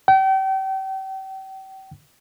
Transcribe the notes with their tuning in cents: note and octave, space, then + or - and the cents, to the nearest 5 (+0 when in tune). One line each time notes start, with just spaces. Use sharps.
G5 -35